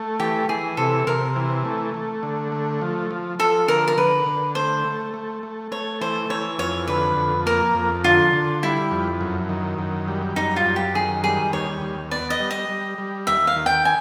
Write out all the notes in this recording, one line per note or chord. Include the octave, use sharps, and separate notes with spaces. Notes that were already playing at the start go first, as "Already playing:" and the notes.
Already playing: A3
E3 G4
E3 G#4
C3 A4
C3 A#4
E3
A3
A3
D3
A3
F3
F3
F3 A4
D3 A#4
A#4
D3 B4
D3
A3 C5
A3
A3
A3
A3 C#5
E3 C5
E3 C#5
F2 C#5
D3 B4
F2
A#3 A#4
F2
D3 F4
D3
G3 E4
F2
F#2
D#3
F#2
G3
F#2 D#4
F4
F#2
G4
D#3 G#4
G3 G#4
D#2 C#5
D#2
B3 D5
D#5
G3
D#5
G3
G3
D#2 E5
F5
D#3
G5
G#5